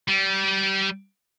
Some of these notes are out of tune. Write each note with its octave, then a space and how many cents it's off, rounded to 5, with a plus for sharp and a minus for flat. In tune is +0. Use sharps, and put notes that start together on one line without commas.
G3 -25